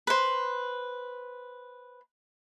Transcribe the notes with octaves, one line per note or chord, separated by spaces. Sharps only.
B4 C5